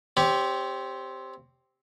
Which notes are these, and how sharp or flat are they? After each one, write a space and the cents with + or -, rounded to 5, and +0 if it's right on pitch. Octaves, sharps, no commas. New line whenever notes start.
C4 +0 G4 +0 C#5 +30